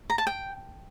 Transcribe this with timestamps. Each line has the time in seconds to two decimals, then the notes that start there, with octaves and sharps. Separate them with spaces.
0.10 A#5
0.18 A5
0.27 G5